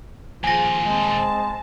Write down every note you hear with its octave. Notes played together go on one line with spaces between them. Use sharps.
D#2 A#2 F3 F4 G#4 G#5 A#6
G#3 C4 A5